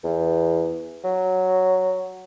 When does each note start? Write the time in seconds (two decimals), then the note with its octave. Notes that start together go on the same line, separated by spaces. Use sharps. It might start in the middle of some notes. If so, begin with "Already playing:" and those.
0.04 E2
1.04 F#3